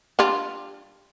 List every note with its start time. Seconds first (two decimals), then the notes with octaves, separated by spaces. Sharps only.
0.19 G3 D4 F4